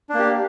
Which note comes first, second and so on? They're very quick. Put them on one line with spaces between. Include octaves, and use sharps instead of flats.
D4 A#3 G4